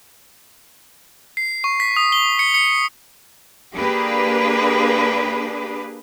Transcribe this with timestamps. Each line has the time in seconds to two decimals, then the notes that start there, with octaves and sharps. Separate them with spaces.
1.37 C7
1.64 C#6
1.80 B6
1.96 D#6
2.12 G7
2.39 C#7
2.54 C#7
3.75 A#3 D4 G4 G#4 B4